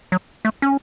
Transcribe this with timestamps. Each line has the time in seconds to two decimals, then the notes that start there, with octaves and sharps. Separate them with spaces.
0.12 F#3
0.45 A3
0.62 C#4